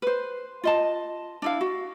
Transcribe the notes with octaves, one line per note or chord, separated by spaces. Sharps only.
B4 C5
F4 D#5 A5
D4 E4 F5
F#4